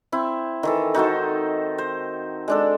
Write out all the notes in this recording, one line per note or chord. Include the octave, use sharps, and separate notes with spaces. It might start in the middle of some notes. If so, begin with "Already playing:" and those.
C4 E4
D#3 E3 A4
D#4 F#4 A4 C5
C5
G#3 D4 A4